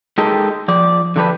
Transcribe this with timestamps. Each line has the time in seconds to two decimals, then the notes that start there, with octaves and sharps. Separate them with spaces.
0.18 G#3 D#4 G4 A4 A#4 D#5
0.68 F3 D5
1.16 D3 F3 D4 G4 B4